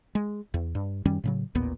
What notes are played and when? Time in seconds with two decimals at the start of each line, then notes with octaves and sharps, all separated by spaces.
0.15 G#3
0.54 E2
0.75 G2
1.05 F#2 D#3 G3 C#4
1.24 A2 C#3 F#3
1.55 A1 D#2 A#2 B3